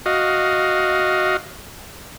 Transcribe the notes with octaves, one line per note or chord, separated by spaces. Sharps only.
F#4 D#5 F5